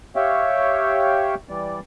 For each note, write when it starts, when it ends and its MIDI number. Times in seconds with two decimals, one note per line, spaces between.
0.16 1.35 67
0.16 1.35 73
0.16 1.35 76
0.16 1.35 77
0.16 1.35 79
1.49 1.80 52
1.49 1.80 55
1.49 1.80 74